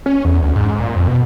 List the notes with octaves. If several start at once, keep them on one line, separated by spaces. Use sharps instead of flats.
C#4
E2
D2
G#2
G#2
A#2
F2
B2